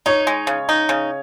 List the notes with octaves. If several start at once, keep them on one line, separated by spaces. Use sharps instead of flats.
D#4 C#5
G#3
C#3
D#4
C#3